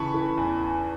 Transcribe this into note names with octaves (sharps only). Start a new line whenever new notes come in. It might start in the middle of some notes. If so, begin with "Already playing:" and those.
Already playing: C#3 E3 A5 B5 C#6
E3
E2